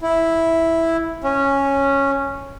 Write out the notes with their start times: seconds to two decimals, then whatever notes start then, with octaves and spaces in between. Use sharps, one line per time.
0.02 E4
1.24 C#4